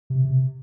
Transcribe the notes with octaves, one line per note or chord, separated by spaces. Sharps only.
C3
C3